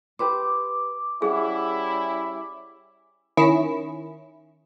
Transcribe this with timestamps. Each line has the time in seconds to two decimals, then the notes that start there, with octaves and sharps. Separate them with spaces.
0.19 G4 B4 C5 D6
1.22 G3 C#4 E4 F#4 G#4 F#5
3.37 D#3 C#4 E4